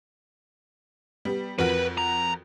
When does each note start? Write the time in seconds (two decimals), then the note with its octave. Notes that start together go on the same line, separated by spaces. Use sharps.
1.25 G3 B3
1.59 F2 F#4 A#4 B4
1.98 A#5